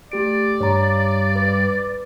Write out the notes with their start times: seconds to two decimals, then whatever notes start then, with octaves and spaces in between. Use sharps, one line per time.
0.12 A3 G4 D5 D7
0.60 G2 C#5 A#5
1.36 B4